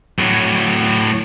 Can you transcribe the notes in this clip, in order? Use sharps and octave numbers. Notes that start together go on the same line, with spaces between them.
A2 F#3